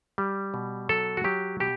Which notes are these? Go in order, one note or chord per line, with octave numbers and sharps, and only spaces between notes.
G3
B2
F#3 A4
F#4
F#3 G4
B2 G4